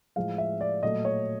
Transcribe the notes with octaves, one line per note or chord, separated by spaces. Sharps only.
A2 F3 G#3 F5
E5
D5
A#2 F#3 A3 D#5
C#5